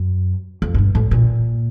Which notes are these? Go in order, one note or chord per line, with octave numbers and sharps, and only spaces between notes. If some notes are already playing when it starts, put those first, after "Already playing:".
Already playing: F#2
F2
G#2
G2
A2
A#2